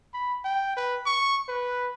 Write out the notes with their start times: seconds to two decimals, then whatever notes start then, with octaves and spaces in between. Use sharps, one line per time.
0.14 B5
0.44 G5
0.76 B4
1.06 C#6
1.49 B4